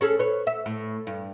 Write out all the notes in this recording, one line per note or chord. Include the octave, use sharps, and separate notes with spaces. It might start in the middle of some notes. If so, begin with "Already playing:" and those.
C#4 G#4 A4
B4 C#5
E5
A2
G2